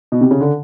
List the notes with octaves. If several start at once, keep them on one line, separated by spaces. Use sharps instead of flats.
B2
C3
C#3
D3